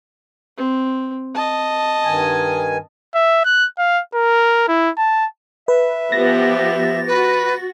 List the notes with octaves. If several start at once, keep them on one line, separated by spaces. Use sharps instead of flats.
C4
D#5 A5
G2 D#3 G#5
E5
F#6
F5
A#4
E4
A5
B4 E5
F3 B3 G4 A6 A#6
F#4 B4